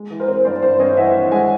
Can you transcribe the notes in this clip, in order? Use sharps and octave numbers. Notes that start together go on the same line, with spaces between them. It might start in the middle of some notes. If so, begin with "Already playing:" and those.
Already playing: G#3
E3
A#4 C5
C4
G2 C5 D5
G2 C5 D5
C4 C#5 D#5
E3 E5 F#5
G2
G#3 F#5 G#5